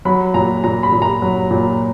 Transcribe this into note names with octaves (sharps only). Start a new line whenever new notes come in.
F#3 B5
A#2 A#5
A#2 A#5
B5
A#2
A#5
F#3
A#2